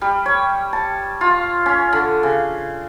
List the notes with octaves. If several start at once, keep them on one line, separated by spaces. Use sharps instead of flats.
G3
C#5
A5
F4
C#4
D3
C#3